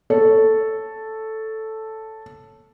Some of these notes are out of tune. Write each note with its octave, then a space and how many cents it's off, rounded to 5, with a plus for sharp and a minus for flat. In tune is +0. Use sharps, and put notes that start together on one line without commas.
A4 +0 C#5 +0